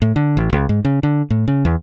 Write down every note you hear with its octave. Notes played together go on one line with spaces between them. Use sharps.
A2
D3
A1
C#2
G#2
C#3
D3
A2
C#3
E2